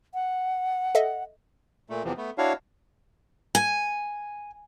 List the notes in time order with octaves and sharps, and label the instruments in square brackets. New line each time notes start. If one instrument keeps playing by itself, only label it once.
[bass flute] F#5
[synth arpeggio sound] A4 D#5 E5
[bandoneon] A#2 A3
E2 C3 E3 F3
A3 B3
D4 E4 F#4 C#5 F5
[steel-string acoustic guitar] G#5